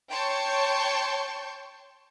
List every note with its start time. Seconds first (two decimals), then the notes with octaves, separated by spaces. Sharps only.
0.11 C#5 G5 A5 C6 C#6 G6